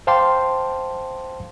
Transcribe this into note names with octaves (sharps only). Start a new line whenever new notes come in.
C5 F5 G5 A5 C6 D6